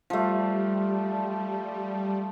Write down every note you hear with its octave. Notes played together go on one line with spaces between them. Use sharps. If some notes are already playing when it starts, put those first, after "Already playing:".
F3 G3 A3